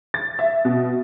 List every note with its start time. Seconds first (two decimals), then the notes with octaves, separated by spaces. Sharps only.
0.14 A6
0.39 E5
0.65 B2